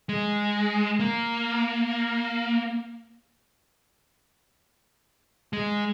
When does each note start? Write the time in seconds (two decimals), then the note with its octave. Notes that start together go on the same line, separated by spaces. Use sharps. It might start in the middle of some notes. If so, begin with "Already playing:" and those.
0.09 G#3
0.99 A#3
5.53 G#3